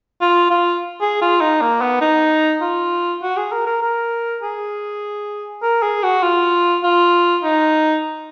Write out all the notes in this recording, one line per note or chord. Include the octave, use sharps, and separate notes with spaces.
F4
F4
G#4
F4
D#4
A#3
B3
D#4
F4
F#4
G#4
A#4
A#4
A#4
G#4
A#4
G#4
F#4
F4
F4
D#4